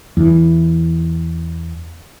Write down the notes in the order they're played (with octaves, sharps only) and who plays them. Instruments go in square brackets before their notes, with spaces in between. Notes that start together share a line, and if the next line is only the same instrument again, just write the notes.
[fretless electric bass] E2 E3